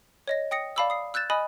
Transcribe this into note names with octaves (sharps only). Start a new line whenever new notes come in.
C#5 D#5 A#6
G5 D#6 A#6 C#7
D5 F5 A5 B5 D6 E6
D#6 C7
E6 F#6 G6 A6 E7
D#5 G#5 B5 D#6 F#6